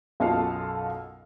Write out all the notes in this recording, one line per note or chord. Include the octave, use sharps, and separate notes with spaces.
B1 F#2 B2 F4 A4 F5